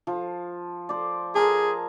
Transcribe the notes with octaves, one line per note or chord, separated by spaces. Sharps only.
F3
C5 D5
G#4 A#4 A5